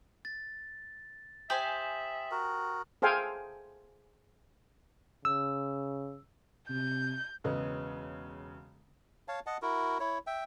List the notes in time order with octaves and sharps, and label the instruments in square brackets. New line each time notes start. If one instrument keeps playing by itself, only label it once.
[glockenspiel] A6
[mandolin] G4 C5 G#5 [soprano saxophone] E5 [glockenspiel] D#6 F#7
[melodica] F#4 A#4
[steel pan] G#4 A4 C5 F5 G5 G#5
[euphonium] C#3 [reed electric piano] E6
[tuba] C3 [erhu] G6
[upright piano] E1 C#3 B3 D#5
[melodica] C#5 F5 A5
D#5 F#5 A5
E4 F#4 A#4
E4 C#5
E5 G5